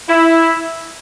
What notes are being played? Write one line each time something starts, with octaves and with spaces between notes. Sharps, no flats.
E4